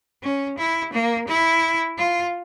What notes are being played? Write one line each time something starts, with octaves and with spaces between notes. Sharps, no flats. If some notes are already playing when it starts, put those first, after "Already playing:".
C#4
E4
A#3
E4
F4